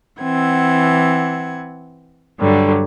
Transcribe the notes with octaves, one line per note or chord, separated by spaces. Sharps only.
E3 C4 F#5 G#6
G2 D3 F#3 G3